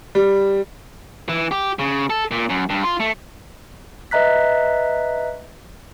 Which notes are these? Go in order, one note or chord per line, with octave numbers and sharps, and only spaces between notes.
G3
E3
G4
C#3
A4
A#2
F#2
G2
F4
A3
B4 D#5 E5 A#5 F#6 B6